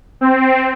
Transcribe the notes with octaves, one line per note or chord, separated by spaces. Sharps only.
C4